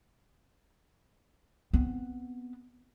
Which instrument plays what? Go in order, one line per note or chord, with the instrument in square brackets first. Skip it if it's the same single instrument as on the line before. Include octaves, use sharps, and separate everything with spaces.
[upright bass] B3 C4